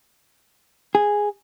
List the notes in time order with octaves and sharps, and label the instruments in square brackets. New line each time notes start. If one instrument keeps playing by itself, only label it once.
[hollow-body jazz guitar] G#4